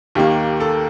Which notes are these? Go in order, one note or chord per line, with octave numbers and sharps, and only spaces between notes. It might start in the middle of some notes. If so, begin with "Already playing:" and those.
D#2 D#3 A#3 G4
A4